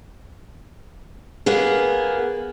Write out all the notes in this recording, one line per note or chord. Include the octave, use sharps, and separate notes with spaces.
A#3 B3 G#4